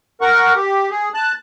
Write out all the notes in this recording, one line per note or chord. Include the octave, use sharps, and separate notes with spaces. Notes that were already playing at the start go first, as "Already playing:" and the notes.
A#4 F#5 C#6
G4
G#4
A5 F#6